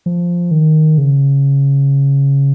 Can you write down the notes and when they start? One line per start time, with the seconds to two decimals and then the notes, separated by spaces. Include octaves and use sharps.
0.06 F3
0.51 D#3
0.98 C#3